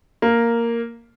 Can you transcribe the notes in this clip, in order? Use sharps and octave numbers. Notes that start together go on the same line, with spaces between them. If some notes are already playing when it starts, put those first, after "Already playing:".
A#3